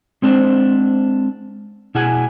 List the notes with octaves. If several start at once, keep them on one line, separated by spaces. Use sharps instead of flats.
G#3 C4 D4 C5
B2 E4 G#4 F#5 G#5